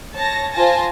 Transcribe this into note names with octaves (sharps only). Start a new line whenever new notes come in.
C#5 A5 A#6
F4 C5 G#5 A5 A#6